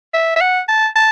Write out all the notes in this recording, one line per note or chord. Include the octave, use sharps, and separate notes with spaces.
E5
E5
F#5
A5
A5